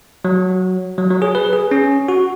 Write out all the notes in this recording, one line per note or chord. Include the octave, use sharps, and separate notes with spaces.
F#3
F#3
F#3
G#4
B4
G#4
C#4
F#4